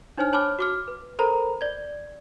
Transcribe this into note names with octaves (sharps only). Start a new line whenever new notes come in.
D4 D#4 C5 C#5 G#5 F6
C#5 A5 B5 D6 F6
F#4 D6 F6
B4
A4 A#4 C5 A#5 B5
D5 G#6